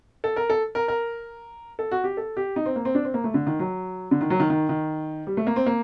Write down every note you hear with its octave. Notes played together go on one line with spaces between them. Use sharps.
A4
A#4
A4
A#4
A#4
A4
F#4
G4
A4
G4
D#4
C4
A#3
C4
D4
C4
A#3
A3
D3
D#3
F#3
D3
D#3
F#3
D#3
D#3
D#3
G3
A3
A#3
C4
A#3